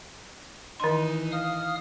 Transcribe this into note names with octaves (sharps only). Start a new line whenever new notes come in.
D#3 E3 D#4 C6
F5 D#6 F6